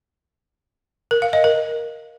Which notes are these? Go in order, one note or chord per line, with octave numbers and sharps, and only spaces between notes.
A#4
F5
D#5
A#4